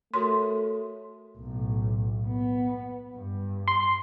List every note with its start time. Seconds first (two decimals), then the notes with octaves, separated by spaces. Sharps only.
0.14 A3 F#4 A#4 C#5 C6
1.37 B1 A2
2.27 B3
3.15 G2
3.68 C6